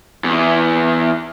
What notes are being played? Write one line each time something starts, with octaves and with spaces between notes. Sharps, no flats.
E2